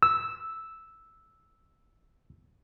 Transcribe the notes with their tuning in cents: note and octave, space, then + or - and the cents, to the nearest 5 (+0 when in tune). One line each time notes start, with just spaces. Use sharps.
E6 -5